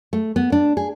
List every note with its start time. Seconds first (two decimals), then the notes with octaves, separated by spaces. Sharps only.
0.13 A3
0.36 B3
0.52 D4
0.77 G#4